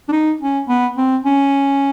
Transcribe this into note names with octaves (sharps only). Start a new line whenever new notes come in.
D4
D#4
C#4
B3
C4
C#4